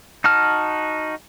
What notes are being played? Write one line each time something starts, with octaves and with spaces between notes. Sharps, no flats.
D#4 F#4 A5 F6